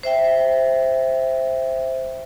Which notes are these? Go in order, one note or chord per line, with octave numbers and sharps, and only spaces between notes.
C5 E5 G5